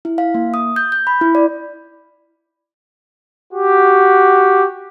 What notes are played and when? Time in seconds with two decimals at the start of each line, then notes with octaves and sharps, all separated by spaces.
0.05 E4
0.18 F5
0.34 A#3
0.54 D#6
0.76 G6
0.92 G6
1.07 B5
1.21 E4
1.35 D5
3.53 F#4 G4